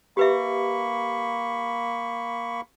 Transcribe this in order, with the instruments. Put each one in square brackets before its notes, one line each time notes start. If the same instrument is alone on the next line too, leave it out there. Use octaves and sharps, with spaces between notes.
[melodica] A#3 B5 C#6 [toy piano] G4 B4 E5